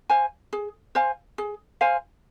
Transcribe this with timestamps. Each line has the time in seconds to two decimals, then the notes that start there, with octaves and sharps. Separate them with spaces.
0.10 C5 F5 G#5
0.53 G#4
0.95 C5 F5 G#5
1.38 G#4
1.81 C5 F5 G#5